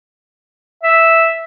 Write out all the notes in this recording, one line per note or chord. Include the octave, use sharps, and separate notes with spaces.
E5